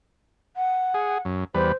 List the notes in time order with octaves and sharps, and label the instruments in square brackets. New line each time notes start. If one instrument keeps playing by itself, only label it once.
[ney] F#5
[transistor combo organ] G#4
F#2
[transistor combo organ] E2 G3 B4 [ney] C5